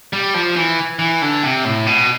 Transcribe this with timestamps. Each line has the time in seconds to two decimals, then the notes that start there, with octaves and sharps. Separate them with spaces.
0.13 G3
0.34 F3
0.56 E3
0.99 E3
1.22 D3
1.43 C3
1.65 A2
1.86 B2